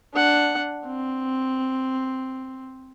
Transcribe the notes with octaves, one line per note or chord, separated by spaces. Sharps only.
D4 F#5
C4